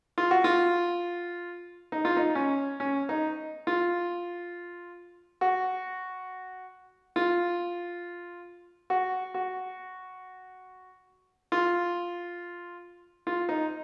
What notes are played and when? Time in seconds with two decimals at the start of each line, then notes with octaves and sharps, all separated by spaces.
0.18 F4
0.31 F#4
0.44 F4
1.92 D#4
2.05 F4
2.17 D#4
2.35 C#4
2.80 C#4
3.09 D#4
3.67 F4
5.41 F#4
7.16 F4
8.90 F#4
9.34 F#4
11.52 F4
13.27 F4
13.49 D#4